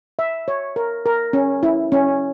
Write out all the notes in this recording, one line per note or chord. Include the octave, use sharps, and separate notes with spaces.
E5
C#5
A#4
A#4
C#4
E4
C#4